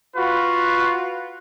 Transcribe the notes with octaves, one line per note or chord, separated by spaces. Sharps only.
F4 F#4 B4